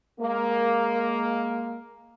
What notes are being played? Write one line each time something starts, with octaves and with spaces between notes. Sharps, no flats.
G#3 A#3